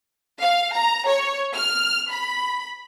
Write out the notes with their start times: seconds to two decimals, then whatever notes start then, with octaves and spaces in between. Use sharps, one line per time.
0.40 F5
0.74 A#5
1.07 C#5
1.54 F6
2.10 B5